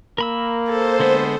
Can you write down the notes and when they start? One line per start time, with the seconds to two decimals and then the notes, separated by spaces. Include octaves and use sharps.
0.18 A#3 A#4 B5 E6
0.69 A4 C5
1.00 D3 G#3 B3